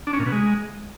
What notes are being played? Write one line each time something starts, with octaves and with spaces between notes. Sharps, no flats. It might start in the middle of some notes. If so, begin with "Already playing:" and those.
D4
C#4
A#2
B2
G#3